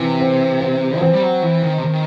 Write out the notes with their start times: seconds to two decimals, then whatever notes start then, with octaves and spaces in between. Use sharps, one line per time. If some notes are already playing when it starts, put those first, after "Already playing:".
Already playing: C3 E3
0.20 C4
0.61 C4
0.98 F#3
1.01 E3 C4
1.13 G3
1.22 F#3
1.42 E3
1.63 D#3
1.78 C3
1.84 D#3